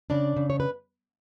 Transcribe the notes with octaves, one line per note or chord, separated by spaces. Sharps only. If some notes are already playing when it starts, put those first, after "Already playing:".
C#3 D4 D5
C#3
C#5
B4